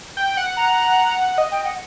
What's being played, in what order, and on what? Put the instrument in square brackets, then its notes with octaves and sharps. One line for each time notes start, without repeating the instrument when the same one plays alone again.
[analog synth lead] G5
F#5
[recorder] A#5
[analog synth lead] D#5
[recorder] G5
F#5